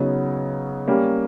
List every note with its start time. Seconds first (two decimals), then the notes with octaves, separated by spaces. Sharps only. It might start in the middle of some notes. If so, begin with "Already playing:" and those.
Already playing: C#3 F#3 B3 D#4
0.88 G3 A#3 C#4